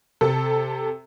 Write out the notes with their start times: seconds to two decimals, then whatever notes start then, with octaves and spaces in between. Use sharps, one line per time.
0.21 C3 A4